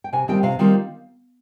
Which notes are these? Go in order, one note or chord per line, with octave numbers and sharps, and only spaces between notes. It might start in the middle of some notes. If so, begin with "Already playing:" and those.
G5
C3 G#5
D#3 G3 C4 F4 G5
C3 F5
D#3 G3 C4 F4